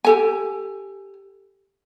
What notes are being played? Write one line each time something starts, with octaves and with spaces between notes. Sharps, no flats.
G4 A4 G#5